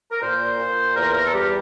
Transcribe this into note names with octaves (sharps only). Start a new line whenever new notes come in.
A#4
A#2 C5
A#2
E2 A#4
A#4
A4
G3 G4